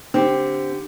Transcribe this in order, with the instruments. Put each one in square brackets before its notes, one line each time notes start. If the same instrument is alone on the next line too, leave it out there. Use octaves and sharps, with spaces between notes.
[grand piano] D3 G4 [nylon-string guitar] C4